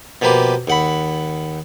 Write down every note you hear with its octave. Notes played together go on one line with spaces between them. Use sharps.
B2 F3 A#3 G4 B4
D#2 F#5 B5